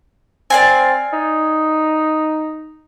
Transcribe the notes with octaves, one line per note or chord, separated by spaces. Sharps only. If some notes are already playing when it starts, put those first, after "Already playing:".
C4 D5 F5 G#5
D#4